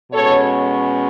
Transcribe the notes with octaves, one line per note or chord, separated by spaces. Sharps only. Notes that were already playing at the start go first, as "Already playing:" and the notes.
B2 G#3 C#4 A4 C#5